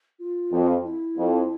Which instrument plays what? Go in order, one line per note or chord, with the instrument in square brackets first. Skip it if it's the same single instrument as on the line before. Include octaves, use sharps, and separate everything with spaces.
[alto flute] F4
[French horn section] F2
[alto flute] E4
[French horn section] F2